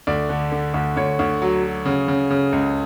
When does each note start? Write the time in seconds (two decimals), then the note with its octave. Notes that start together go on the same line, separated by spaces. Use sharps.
0.07 D2 D5
0.29 D3
0.52 D3
0.74 D2
0.97 D2 C#5
1.19 D2
1.42 F#3
1.64 F#3
1.86 C#3
2.08 C#3
2.30 C#3
2.53 C#2